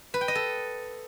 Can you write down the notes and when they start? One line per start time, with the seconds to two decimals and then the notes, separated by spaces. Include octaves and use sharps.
0.14 B4
0.21 G5
0.28 D#5
0.35 A4